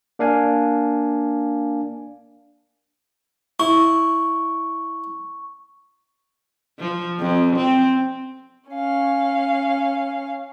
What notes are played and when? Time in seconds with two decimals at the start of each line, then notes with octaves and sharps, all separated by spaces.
0.19 A#3 D4 F5 G#5
3.60 E4 C#6
6.79 F3
7.20 F2
7.56 C4
8.70 C#4 F5